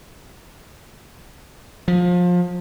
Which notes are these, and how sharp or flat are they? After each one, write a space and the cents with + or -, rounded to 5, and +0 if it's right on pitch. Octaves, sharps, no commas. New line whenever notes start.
F3 +25